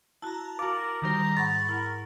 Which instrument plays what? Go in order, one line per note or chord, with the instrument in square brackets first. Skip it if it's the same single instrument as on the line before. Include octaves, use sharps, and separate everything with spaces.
[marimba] E4 F#4 [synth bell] A5 A#5
[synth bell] F#4 A6 [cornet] A#4 [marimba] F5 [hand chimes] D6
[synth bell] D#3 G3 C5 [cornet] A#5
[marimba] G#2 [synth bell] F#5 B5 C#6 [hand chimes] A6
[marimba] E4 [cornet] A#4